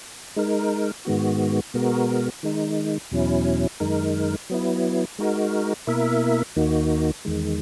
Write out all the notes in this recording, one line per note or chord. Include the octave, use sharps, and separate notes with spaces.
G#3 D#4 A#4
G#2 D#3 G#3 B3 F#4
B2 G#3 B3 F#4 A#4
D#3 G#3 D#4
E2 B2 F#3 C#4 E4
F#2 D#3 G#3 D#4 A#4
F#3 B3 E4
G#3 D#4 F#4 A#4
B2 A#3 E4 A#4 E5
D#2 D#3 A#3 D#4 F#4
E2 D#3 G#3